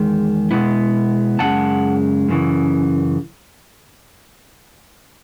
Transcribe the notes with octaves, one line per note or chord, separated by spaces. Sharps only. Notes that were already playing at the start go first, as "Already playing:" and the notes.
Already playing: E2 D#3 G#3
B2 G#3 B3 E4
F#2 C#3 G#3 F#5 A5
F#2 C#3 E3